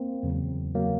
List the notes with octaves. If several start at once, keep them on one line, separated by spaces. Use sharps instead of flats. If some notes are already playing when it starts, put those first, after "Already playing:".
Already playing: A#3 C4
E2 C#3 F#3
C#3 F#3 A#3